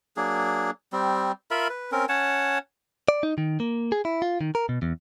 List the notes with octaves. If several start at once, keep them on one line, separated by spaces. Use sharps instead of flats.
F#3 A#3 D4 G#4
G3 C4
F4 A#4 E5 B5
B4
C4 C#4 A#4
C#4 C#5 F#5 A5
D5
D#4
D#3
A#3
G#4
E4
F4
D#3
A#4
B2
E2